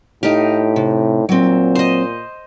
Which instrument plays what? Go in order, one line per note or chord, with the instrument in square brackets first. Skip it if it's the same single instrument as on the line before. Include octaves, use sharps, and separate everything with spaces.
[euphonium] A2 [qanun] D#4 G4 [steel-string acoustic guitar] F5
[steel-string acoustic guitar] C3
[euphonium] A#2 [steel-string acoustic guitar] F#3 C4
[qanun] C5 D#5